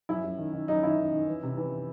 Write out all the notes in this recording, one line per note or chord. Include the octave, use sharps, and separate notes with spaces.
F#2 E4
F#2
D#3
D#3
F#2 D#4
D#3 E4
D#3
D#3
E3
C3
E3